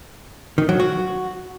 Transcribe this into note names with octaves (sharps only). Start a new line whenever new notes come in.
D#3
F#3
F#4